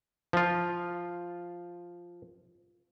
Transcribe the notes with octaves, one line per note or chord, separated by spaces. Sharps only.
F3 F4